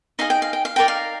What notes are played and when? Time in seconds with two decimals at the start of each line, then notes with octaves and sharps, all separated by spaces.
0.19 D#4 G#4 D#5 F5
0.30 G5
0.42 F5
0.53 G5
0.65 F5
0.76 D#4 A#4 D5 G5
0.88 F5